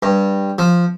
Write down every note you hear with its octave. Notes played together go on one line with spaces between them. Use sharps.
G2
F3